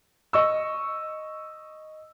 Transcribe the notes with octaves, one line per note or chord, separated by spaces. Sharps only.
D#5 C#6 E6